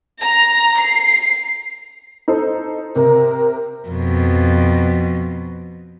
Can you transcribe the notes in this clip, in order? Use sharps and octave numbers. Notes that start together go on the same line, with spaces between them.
A#5
C7
D#4 A4 C5
C3 A#4
F2 B2